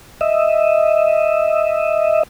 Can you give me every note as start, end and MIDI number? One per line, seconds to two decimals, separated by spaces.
0.21 2.23 75
0.21 2.23 76